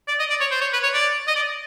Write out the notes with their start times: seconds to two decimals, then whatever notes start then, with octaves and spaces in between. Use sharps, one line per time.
0.08 D5
0.19 D#5
0.30 D5
0.41 C#5
0.51 C5
0.61 C#5
0.73 B4
0.83 C#5
0.94 D5
1.28 D#5
1.36 D5